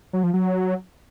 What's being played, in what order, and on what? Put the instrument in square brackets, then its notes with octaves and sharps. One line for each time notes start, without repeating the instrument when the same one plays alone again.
[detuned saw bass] F#3
F3
F#3